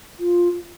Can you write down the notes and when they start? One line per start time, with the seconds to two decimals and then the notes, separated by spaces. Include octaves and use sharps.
0.19 F4